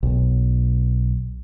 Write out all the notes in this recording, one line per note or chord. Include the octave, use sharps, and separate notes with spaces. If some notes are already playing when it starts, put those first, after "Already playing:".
B1